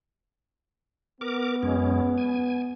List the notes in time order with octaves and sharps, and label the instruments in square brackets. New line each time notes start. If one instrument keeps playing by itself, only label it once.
[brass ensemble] B3 [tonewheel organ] A#4 D6
[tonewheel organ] F#2 G#3 C#4
G#5